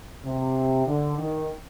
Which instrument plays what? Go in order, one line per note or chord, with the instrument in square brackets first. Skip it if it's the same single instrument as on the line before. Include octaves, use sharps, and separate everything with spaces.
[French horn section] C3
D3
D#3